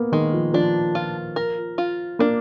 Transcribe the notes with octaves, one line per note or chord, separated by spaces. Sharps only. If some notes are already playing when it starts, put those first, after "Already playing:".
Already playing: A#3 B3
D#3 G#3
F3
F3 D4
F4
A#4
F4
A#3 D4